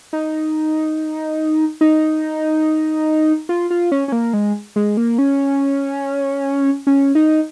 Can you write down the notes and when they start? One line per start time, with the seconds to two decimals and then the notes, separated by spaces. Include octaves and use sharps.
0.13 D#4
1.81 D#4
3.49 F4
3.70 F4
3.92 C#4
4.08 C#4
4.12 A#3
4.33 G#3
4.76 G#3
4.97 A#3
5.18 C#4
6.87 C#4
7.15 D#4